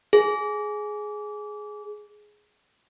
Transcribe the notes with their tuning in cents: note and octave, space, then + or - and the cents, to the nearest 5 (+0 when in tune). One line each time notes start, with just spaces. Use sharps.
G#4 +10